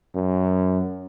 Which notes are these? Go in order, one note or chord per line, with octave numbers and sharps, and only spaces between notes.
F#2